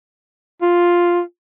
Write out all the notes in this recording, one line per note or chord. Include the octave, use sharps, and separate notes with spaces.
F4